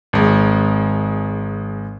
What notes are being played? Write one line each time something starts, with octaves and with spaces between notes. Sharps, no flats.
G#1 G#3